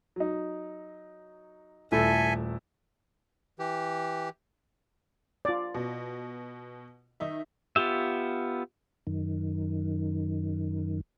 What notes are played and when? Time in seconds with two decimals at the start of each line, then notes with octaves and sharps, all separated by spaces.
0.16 F#3 D#4
1.92 D#1 A3 E4 A4 E5 G#5
3.59 E3 G4
5.45 F4 D5
5.75 B2
7.20 D#3 D#4 E5
7.76 B3 F4 G4 E5
9.07 F#2 D#3